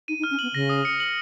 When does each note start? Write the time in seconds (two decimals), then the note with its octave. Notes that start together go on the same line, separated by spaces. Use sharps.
0.08 D#4 D#7
0.19 D#4
0.24 F6
0.31 C#4
0.39 B3 F#7
0.54 C#3 A#6
0.69 D#6
0.85 C#7
1.00 F#7